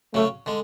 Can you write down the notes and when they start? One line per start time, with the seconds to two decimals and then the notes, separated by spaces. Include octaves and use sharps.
0.14 C#3 F#3 A3 C#4
0.46 D3 G#3